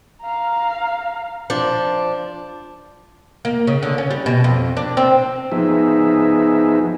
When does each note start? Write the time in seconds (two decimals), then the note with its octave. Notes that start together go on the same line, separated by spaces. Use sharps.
0.22 F5 A#5
1.50 F3 D4
3.45 A#3
3.67 C#3
3.83 D3
3.98 C#4
4.11 G3
4.26 B2
4.44 F2
4.77 D4
4.97 C4
5.52 F3 B3 D#4 G#4 E5